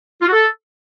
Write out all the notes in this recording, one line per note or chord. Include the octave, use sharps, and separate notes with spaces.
F4
F#4
A4